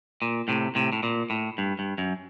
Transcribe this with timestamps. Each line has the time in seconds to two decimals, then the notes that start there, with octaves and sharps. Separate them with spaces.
0.22 A#2
0.48 A2 C3
0.75 A2 C3
0.92 A2
1.03 A#2
1.30 A2
1.58 G2
1.79 G2
1.98 F#2